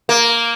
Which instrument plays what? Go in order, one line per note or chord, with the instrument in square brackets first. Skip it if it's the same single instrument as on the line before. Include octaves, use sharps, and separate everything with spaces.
[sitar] A#3